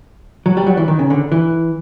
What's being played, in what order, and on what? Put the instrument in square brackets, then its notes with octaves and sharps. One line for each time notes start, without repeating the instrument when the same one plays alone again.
[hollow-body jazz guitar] F#3
G3
F#3
E3
D#3
C#3
D3
E3